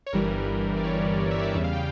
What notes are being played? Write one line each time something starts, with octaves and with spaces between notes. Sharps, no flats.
C#5
G1 G2 E3 G3 A#4
D5
C#5
E5
D5
E5
E2 C#3 G3 E5
F5
G5